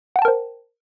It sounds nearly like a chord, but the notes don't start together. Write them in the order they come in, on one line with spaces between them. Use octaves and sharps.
F#5 G5 A5 A#4 C5